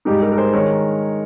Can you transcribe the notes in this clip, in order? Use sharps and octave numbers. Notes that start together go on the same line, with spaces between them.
G#2 G3 D#4 G4
G4 A#4
A#4
G#4 C5
D#3 G#3 A#4 C#5